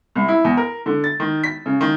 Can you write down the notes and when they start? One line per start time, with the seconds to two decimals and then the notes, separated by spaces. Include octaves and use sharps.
0.16 C2
0.28 E4
0.44 E2
0.57 A#4
0.86 D3
1.04 A6
1.20 D#3
1.44 B6
1.66 C#3
1.81 D#3